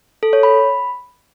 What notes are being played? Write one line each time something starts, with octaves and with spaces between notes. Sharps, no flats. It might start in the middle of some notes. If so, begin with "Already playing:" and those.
A4
C#5
B5